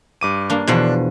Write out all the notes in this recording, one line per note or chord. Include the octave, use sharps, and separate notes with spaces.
G2 D6 D#7
A#3 D4
E2 B2 F3 D4